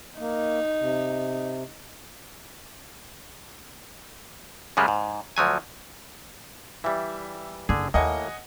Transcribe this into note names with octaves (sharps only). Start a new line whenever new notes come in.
A#3 D#4
C3
F#2 C#3 G3 G#3
G#2
D2 F3 F#3 G#5
E3 G3 E5
F#1 D3 G#4
D#2 A2 A#3 D#5 F#5 G#5